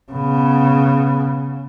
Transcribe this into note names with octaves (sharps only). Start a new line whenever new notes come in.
C#3 B3